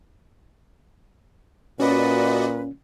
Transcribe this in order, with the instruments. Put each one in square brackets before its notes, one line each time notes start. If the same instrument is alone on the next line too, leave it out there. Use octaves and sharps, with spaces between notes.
[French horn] A#2 [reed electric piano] C#4 [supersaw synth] F#4 D5 D#5 [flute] B4